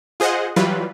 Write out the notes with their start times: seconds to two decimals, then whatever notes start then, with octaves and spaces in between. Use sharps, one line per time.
0.20 F4 G#4 C5 D#5 F#5
0.56 E3 F#3 G3 F4 B4